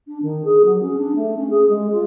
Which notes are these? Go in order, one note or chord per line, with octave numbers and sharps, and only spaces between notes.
D4
D#3
G#4
F#3
C#4
D4
A3
C#4
G#4
G#3
F4